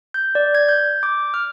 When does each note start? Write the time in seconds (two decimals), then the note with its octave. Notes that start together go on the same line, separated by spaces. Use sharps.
0.14 G6
0.35 D5
0.55 G#6
0.69 G6
1.03 D6
1.34 F6